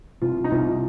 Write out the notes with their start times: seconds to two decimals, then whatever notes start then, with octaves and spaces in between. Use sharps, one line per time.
0.22 C2 F4
0.44 D#4
0.51 C2 F4